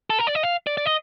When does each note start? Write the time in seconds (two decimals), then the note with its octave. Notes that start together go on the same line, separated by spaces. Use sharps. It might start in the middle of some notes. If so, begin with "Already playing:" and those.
0.10 A4
0.19 A#4
0.27 D5
0.35 D#5
0.43 F5
0.67 D5
0.77 D5
0.86 D#5